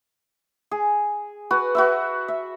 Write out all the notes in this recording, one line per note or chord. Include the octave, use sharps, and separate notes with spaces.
G#4
F#4 B4
F#4 B4 E5
E5